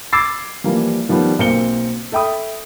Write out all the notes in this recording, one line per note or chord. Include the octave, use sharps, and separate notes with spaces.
B5 D6 E6 G#6 A6 C7
E3 F3 G3 A#3
D#3 F3 G3 B3
B1 A#3 C4 C#7 G7
A4 E5 G5 B5 D#6